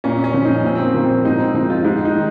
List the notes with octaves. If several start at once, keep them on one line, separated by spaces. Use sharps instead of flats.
A#2 C#4
C#4
F3
D#4
A#2 C4
C4
A#3
F3
C4
G#2 D#4
C4
F3 D#4
F4
G#2 D#4
D#4
D#3